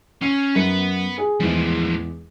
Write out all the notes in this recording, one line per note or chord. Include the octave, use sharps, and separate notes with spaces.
C#4 C7
F#2 B4 F#5
G#4
E2 A2 F3 G#3